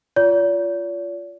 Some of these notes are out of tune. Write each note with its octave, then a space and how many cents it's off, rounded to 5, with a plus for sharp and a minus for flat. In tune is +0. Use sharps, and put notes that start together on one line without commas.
F4 -10 D5 -45